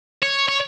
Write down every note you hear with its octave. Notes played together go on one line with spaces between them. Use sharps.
C#5
C#5